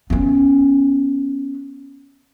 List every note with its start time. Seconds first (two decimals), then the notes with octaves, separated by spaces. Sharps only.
0.10 B3 C#4